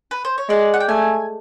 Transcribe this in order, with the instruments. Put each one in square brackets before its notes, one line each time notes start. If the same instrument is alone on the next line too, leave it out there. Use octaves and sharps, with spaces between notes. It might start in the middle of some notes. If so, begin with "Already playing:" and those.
[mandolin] B4
C5
C#5
[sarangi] G#3 [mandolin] D5
[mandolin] F#5
G5
[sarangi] A3 [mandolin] G#5